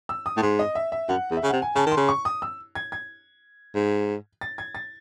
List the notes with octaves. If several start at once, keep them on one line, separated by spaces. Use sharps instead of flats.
E6
D#6
A2
G#2 C6
D#5
E5
E5
F#2 F#5
E2
E5
C#3
C3 F#5
G#5
C#3 A5
D#3
C6
C#3
C#6
D#6
E6
G#6
G#6
G#2
A6
G#6
A6